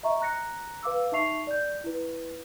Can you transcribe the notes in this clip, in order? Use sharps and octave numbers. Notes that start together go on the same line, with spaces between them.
D#5 E5 A#5 C#6
A#5 F#6 A#6 C#7
B4 F5 D6 E6
D#4 E5 A5 C#6 C7 F7
D5 G6
E4 B4